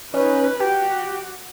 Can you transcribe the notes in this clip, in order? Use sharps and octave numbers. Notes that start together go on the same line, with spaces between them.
C#4 D#4 B4
F#4 G4